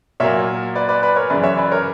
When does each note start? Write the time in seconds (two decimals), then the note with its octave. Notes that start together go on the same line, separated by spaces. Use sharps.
0.20 A#2 F#3 A#3 C#5 E5
0.75 B4 D5
0.89 B4 D5
1.03 B4 D5
1.16 A#4 C#5
1.30 F#2 C#3 E3 B4 D5
1.43 C#5 E5
1.57 B4 D5
1.72 A#4 C#5